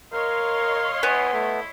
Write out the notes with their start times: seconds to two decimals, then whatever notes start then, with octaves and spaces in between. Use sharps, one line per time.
0.13 A#4 C#5 D#5 F5 C6
1.03 B3 E4 G#5
1.33 A3 E4